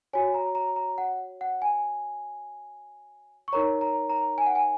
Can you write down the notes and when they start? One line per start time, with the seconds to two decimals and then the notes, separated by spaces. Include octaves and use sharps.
0.13 F#4 C#5 G#5
0.34 A#5
0.55 A#5
0.76 A#5
0.98 F#5
1.41 F#5
1.62 G#5
3.48 C#6
3.53 D#4 A#4 C#5 A#5
3.81 A#5
4.10 A#5
4.38 G#5
4.46 F#5
4.55 G#5